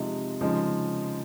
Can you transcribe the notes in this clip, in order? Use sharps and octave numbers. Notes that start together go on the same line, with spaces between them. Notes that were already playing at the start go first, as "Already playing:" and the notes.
Already playing: C3 F3 G#3 D#4
C#3 F3 G#3 D#4